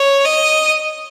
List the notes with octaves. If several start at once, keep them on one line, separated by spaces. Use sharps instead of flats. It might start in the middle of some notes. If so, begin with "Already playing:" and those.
Already playing: C#5
D#5